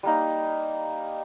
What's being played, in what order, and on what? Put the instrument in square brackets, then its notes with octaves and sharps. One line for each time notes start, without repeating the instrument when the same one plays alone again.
[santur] G3 A#3 D#4